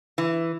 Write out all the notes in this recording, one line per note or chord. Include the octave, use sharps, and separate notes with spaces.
E3